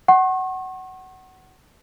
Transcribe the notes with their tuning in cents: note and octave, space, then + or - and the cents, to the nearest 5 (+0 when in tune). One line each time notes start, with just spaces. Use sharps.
F#5 +20 C#6 -40